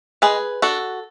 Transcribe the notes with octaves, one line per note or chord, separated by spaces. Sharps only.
G#3 G#4 B4
D4 F#4 A4